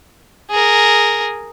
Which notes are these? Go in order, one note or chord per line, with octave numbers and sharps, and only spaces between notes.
G#4 A#4